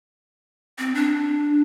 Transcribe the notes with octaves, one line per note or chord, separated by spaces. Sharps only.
C4
D4